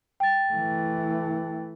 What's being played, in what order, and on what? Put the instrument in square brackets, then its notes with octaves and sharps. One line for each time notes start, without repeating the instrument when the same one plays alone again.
[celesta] G5 A6
[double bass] E3 A3